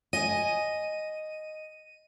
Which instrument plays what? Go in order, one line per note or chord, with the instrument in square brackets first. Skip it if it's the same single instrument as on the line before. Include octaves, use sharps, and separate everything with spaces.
[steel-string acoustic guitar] D#5 G#5 [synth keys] D#7